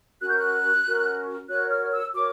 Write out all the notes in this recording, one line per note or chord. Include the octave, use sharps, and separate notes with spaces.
C#4 F#4 A#4 F#6
G6
F#6
C#4 F#4 A#4
F#4 A#4 C#5 F#6
F6
E6
F#4 A#4 C#5 D6